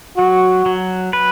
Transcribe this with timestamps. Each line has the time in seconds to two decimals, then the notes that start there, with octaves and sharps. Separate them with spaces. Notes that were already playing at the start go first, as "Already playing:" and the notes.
0.18 F#3 F#4
0.66 F#3
1.13 B4